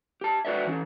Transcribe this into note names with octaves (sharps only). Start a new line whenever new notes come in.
G4 A5
F#4 B4 D5 E5
E3 C#4